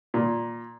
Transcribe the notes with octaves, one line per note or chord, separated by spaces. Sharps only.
A#2